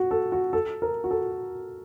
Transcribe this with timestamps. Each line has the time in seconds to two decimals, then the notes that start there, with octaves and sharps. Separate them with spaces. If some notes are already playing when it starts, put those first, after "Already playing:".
Already playing: F#4
0.11 A4
0.32 F#4
0.53 A4
0.82 A#4
1.04 F#4
1.11 A4